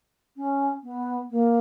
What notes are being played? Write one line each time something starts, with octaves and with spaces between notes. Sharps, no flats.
C#4
B3
A#3